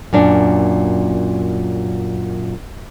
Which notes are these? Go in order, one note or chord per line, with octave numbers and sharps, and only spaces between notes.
F#2 A#2 D4